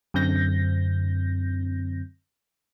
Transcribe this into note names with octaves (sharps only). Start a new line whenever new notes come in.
F#2 D3 C4 G6 A#6